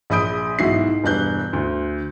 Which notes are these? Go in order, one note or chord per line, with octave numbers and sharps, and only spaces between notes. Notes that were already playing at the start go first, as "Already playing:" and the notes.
A#1 G#4 B5 D#6 G6 D7
B1 G#2 E4 F#4 C7
E1 G2 F#6 G6
D2